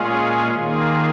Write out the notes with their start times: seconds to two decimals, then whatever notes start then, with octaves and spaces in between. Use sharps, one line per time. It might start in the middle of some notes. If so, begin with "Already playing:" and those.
Already playing: A#2 G#3 C#4 F4 G#4
0.50 D#3 A#3 F4 G#4